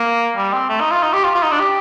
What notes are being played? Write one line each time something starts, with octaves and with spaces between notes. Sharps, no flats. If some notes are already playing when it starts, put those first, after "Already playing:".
Already playing: A#3
G3
C4
A3
D#4
F4
D#4
G4
F4
F4
D#4
D4
G4